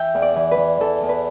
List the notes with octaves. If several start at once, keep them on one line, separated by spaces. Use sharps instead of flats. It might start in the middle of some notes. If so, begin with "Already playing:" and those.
Already playing: E3 E5 G5
E2
D5
E3
B4
E3
E3 A4
E2
B4